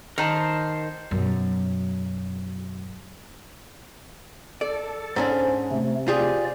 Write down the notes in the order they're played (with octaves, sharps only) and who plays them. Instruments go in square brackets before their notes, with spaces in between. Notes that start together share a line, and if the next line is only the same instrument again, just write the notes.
[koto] D#3 [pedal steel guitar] A#4 C5 A5
[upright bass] F#2 B2
[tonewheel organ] A4 [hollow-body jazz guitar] D5
[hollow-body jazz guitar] G#2 C#4 D4 [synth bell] C5
[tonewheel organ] C3 [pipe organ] A3
[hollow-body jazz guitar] F4 G4 G#4 [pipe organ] D5